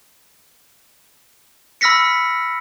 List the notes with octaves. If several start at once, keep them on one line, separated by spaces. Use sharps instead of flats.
B5 E6 F6 A#6 B6 C#7